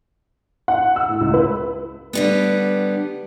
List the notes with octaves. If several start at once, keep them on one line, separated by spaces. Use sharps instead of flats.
F#5
E6
A2
C#2
B4
D3 G3 B3